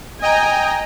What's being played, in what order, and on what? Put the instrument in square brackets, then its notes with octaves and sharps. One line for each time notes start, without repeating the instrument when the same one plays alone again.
[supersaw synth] D#5 G5 A#5 [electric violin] G#5